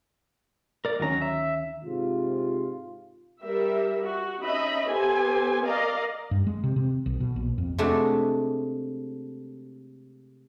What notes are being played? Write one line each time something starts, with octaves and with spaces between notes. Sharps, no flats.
A#4 D5
D2 D#3 F#3 C#4 A#5
E5
G#2 C3 F4
G3 A#4 E5
F#4
C#4 D#4 D#5 E5 B5
B3 G4 A4 C5 G#5
A#4 D5 D#5 F5 A#5
G2
G#3
C3
C3
B1
B2
A#1
F2
C3 G#3 A3 D4 F#4 G#4